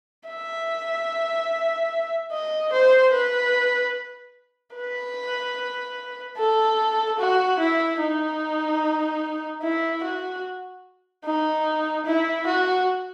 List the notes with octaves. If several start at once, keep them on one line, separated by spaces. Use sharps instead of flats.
E5
D#5
C5
B4
B4
A4
F#4
E4
D#4
E4
F#4
D#4
E4
F#4